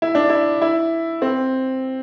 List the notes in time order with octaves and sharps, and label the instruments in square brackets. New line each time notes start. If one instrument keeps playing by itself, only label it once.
[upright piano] E4
D4
E4
E4
C4